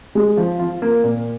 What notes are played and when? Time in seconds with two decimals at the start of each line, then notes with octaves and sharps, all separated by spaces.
0.15 G#3
0.37 F3
0.59 F4
0.82 A#3
1.04 A#2